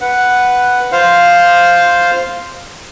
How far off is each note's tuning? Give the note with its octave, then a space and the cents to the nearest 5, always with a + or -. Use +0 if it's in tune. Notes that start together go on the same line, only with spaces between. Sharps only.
B4 +0 F#5 +0
F4 +0 C5 +0 F5 +0